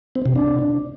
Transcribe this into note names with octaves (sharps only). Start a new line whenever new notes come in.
C4
C3
D4